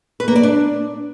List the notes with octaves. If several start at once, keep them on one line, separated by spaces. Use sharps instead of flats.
B4
A#3
D5
D4